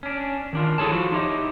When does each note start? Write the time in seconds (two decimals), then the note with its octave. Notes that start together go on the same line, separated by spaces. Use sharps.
0.03 C#4 D4
0.53 D#3 D4 F4
0.78 E4 G#4 A4 C#5 A5
0.91 F3 F4 F#4
1.12 D#4 E4 G4 C#5 D#5